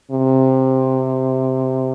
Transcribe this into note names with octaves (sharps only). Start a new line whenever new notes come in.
C3